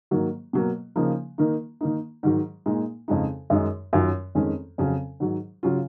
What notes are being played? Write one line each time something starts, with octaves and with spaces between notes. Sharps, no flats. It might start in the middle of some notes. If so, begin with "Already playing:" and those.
G#2 D#3 F#3 A#3
B2 F#3 A#3
C#3 F3 A#3 D#4
D#3 A#3 D#4
D#3 A#3 D#4
G#2 D#3 F#3
A#2 G#3 D#4
F2 C#3 G#3 D#4
F#2 D#3 G#3 D#4
F#2 D#3 F#3 C#4 F4
F2 D#3 G#3 C#4
F2 C#3 F#3 C#4
G#2 D#3 F#3
C#3 F#3 C#4 F4